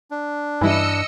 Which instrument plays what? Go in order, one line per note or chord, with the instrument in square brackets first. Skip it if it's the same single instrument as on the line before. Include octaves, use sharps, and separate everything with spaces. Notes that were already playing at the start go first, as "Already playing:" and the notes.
[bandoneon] D4
[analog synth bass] G2 [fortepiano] E3 G3 E4 [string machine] D#5 E6 C#7